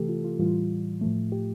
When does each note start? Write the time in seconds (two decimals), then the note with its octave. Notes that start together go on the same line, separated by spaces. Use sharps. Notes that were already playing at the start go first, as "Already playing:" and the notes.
Already playing: C3 E3 A3 G4 A4
0.09 F4
0.24 F4
0.39 A2 E3 G3 F4
0.55 F4
1.01 A2 F3 A3
1.32 G4